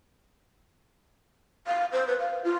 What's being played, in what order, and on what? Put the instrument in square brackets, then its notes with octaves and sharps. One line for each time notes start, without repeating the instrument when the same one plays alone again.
[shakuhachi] F5
C5
B4
F5
F4